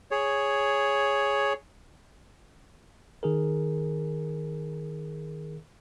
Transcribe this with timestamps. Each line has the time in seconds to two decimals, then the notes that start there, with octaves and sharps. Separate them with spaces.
0.11 G#4 C#5
3.23 D#3 G#4 A#4